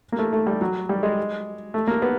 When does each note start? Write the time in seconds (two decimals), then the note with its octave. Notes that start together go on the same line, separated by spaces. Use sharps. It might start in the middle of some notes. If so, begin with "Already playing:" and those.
0.12 A#3
0.19 A3
0.33 A3
0.47 G3
0.61 F#3
0.89 G3
1.03 G#3
1.74 A3
1.87 A#3
2.02 B3